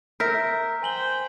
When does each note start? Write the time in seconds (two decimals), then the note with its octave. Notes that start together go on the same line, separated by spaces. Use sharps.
0.20 A#4 E5 G6 B6
0.83 C5 G5 G#5 F#7 G7